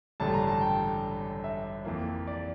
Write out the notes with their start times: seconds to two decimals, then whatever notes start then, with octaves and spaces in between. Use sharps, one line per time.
0.20 A1 G2 D3 A3 A5
0.34 A#5
0.47 A5
0.61 G5
1.44 E5
1.85 F2 E3 A#3
2.27 D5